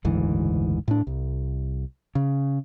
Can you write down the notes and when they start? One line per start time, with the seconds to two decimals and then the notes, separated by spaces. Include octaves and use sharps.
0.05 F#1 D2 G#2 E3
0.88 A2 D4
1.07 C2
2.15 C#3